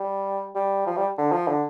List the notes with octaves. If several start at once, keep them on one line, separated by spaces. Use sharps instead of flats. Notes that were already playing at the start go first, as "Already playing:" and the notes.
Already playing: G3
G3
F3
G3
D3
F3
D3